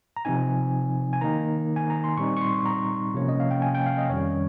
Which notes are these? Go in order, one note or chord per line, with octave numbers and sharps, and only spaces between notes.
A#5
C3 F3 C4 D#4 G#5
G#5
D#3 A#3 D#4 A#5
G#5
A#5
C6
A#2 G3 C4 D#4 C#6
C#6
C6
A#5
C3 F3 A#3 C#4 C#5
D#5
F5
G5
G#5
G5
F5
D#5
F2 D#3 G3 C#4 C#5